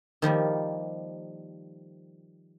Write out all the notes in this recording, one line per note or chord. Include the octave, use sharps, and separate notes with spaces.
D#3 F3 G3 A#3